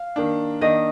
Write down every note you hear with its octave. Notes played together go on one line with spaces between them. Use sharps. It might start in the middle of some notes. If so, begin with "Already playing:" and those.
Already playing: F5
D#3 A#3 D4
D#3 A#3 D4 D#5